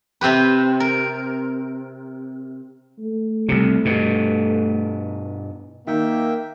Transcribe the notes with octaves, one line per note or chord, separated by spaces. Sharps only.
C3 C4 G4 B4
A#4
A3
C2 C3
G2 B2
D#3 A#3 E5 G5